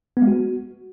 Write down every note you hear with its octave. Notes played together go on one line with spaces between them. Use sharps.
B3
G#3
F#4